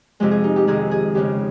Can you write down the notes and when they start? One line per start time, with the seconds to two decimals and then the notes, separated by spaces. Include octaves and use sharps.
0.20 F2 C3 F3 G#3 G4
0.31 G#4
0.44 D#4
0.56 G4
0.67 F2 C3 D#3 G#3 G#4
0.91 G#4
1.15 F2 C#3 G#3 G4